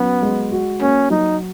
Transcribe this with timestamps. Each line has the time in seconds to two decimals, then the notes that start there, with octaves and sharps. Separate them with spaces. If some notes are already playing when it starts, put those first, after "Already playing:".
Already playing: F#3 B3 C#4
0.22 G#3
0.52 F#4
0.81 A#3 C#4
1.10 F#3 D#4